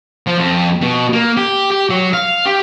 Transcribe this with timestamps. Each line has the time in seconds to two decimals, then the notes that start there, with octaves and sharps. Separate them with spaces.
0.27 F3
0.38 F2
0.82 B2
1.13 A#3
1.37 G4
1.71 G4
1.90 F#3
2.13 F5
2.46 G4